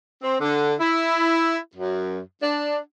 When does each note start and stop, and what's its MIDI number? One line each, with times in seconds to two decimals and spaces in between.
0.22 0.36 60
0.41 0.74 50
0.79 1.57 64
1.76 2.19 42
2.42 2.78 62